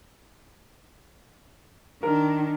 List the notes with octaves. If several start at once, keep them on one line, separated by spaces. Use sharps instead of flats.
D#3 D4 A#4